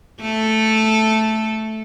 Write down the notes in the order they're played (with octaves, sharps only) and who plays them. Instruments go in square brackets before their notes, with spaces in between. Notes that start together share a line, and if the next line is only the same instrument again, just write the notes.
[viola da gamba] A3 A4